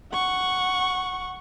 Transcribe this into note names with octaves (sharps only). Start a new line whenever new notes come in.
F#5 C#6